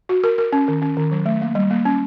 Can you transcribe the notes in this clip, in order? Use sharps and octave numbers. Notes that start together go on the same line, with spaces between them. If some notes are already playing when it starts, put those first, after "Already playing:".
F#4
A#4
A#4
C#4
D#3
C#4
D#3
F#3
A3
A#3
G3
A#3
C#4